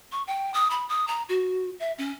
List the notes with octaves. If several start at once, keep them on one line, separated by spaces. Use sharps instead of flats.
C#6
G5
D#6
B5
D#6
A#5
F#4
E5
C#4